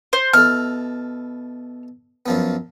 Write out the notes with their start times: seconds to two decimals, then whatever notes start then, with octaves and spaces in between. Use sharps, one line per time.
0.13 C5
0.33 B2 E4 A4 F6
2.26 F#2 F3 B3